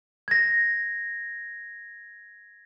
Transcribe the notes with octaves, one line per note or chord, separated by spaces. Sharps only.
G#6 A#6